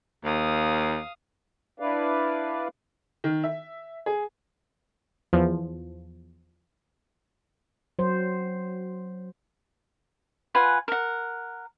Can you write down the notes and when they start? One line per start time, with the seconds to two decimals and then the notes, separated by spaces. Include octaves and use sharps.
0.25 D#2 F5 D#6
1.80 D4 E4 B4 D5 F5
3.24 D#3
3.44 E5
4.06 G#4
5.33 E2 F3
7.99 F#3 C5
10.55 F4 B4 F#5 G#5
10.88 A#4 F#5